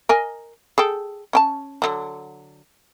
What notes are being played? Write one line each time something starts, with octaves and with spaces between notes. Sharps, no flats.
A#4 D#5 G#5
G#4 A4 G5
C#4 G5 A5
D3 F#3